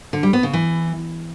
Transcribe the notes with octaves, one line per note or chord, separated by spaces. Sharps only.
D3
G3
B3
C#3
E3